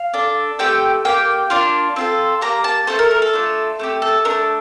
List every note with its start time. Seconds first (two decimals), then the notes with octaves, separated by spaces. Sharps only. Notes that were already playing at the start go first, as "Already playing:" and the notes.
Already playing: F5
0.14 D4 A4
0.59 A3 C4 G4 G5
1.05 A#3 D4 G4 G5
1.50 A#3 D4 F4
1.96 C4 F4 A4
2.41 A#3 D4 G4 A#5
2.64 A5
2.87 A3 E4 A4 C5
2.99 A#4
3.11 A#4
3.22 A4
3.33 A3 D4 F4
3.79 A3 C4 G4
4.02 A4
4.25 A3 D4 A4 A#4